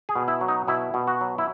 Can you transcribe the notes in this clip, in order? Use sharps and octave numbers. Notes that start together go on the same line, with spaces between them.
G#4
B2
E4
F#3
D#4
B2 E4
B2
F#4
F#3
E4